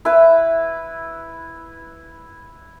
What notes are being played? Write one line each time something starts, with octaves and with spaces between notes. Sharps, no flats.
E4 B4